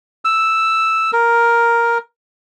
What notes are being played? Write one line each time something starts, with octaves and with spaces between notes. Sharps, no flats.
E6
A#4